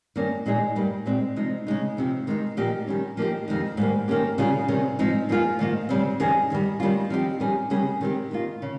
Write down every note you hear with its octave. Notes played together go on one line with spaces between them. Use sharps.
G2 D#3 A#3 C#4
A#2 F3 G#3 D#4 G#4
G2 G3 A#3
A#2 G#3 C4
C3 F3 G#3 D#4
C#3 G#3 D#4
F2 C3 F3
D#3 G#3 C4 D#4
A#2 F3 A#3 D#4 G4
D#3 G3 C#4
F3 A#3 D#4 G4
F2 D#3 G#3 D#4
G#2 G3 A#3
D#3 A#3 C#4 G4
C#3 G3 C#4 F4 G#4
C3 D#3 G3 C#4 G#4
G#2 F3 C4 D#4
G2 F3 A#3 F4 G#4
G#2 D#3 A#3 F4
C#3 G3 C4
F2 D#3 G3 C#4 G#4
G2 D#3 G3
D#3 G3 A#3 C#4 F4
F3 C4 D#4 G4
D#3 G3 C#4 G#4
C#3 G3 A#3 C#4 G#4
D#3 G#3 C4 G4
D#3 A#3 F4
C#3